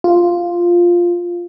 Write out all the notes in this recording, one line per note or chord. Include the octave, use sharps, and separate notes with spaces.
F4